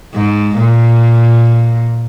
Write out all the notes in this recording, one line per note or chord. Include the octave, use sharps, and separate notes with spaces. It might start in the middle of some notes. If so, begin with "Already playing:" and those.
G#2
A#2